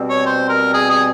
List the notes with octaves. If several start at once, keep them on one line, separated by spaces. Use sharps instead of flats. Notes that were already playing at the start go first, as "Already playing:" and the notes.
Already playing: B2 G3 C4
C#5
C5
A#4
G#4
G#4